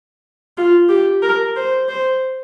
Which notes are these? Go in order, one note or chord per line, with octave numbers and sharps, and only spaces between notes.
F4
G4
A#4
C5
C5